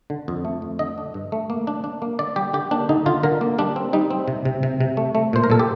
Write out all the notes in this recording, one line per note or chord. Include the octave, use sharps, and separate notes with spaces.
D3
F2
A3
F2
D3 D#5
D4
G2
A3
A#3
D4
D4
A#3
D3 D5
G3 G4
D3 G4
A#3 D4
D3 D#4
D3 F4
D3 A#4
A#3
G3 D4
C4
G3 D#4
C4
C3
C3
C3
C3
A3
A3
A#2 C5
A#4
A#2 A4
G4